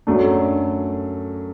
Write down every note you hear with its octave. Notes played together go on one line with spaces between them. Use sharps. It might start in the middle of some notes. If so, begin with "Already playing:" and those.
F#2 F#3 A3 D4